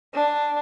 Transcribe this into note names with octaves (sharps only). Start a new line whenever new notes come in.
D4